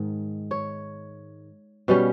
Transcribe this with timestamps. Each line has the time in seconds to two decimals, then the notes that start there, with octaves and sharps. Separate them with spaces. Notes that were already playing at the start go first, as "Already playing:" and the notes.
Already playing: G#2 D#3
0.51 C#5
1.88 B2 G3 C#4